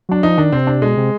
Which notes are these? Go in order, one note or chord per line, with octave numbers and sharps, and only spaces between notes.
F#3 D4
F3 D#4
D#3 D4
C3 C4
D4
B2 G#3
C3